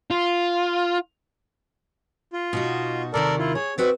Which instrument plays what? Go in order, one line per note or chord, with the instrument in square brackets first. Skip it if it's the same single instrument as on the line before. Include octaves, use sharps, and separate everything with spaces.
[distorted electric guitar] F4
[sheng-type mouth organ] F4
[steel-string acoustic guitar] B2 D#4 F#4
[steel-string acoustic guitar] D#2 C3 D#3 [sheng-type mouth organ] A4 A#4 D5
[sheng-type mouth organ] E4 F4
[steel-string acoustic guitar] G#4 [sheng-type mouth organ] C#5
[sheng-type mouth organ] C4 [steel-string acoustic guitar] F#4 B4 D5